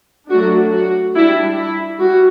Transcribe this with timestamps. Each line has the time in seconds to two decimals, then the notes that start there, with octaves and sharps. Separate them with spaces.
0.30 F#3 A3 D4 F#4
0.73 F#4
1.15 G3 D4 E4
1.57 E4
2.00 G3 F#4